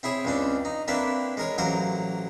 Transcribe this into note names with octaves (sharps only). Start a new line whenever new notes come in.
C4 E4 G#4 C#5
C#2 C#3 C4 D4
D#4
A#3 C4 D4 E4 B4
G#3 A#4 C#5
A1 F#3 A#3 A#4 C5 A#5